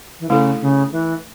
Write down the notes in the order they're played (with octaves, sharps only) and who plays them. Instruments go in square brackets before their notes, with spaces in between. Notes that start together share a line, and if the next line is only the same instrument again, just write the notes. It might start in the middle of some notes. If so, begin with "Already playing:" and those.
[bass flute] E3
[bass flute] C#3 [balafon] A3 E4 A4
[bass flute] C#3
E3